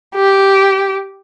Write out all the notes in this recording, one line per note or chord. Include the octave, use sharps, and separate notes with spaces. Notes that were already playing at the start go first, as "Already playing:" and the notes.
G4